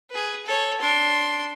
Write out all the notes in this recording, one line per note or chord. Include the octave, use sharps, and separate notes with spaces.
G#4 B4
A4 C#5
D4 C6